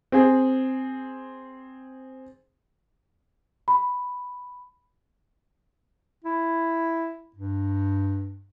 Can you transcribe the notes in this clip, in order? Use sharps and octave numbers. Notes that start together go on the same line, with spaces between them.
C4 G#4
B5
E4
G2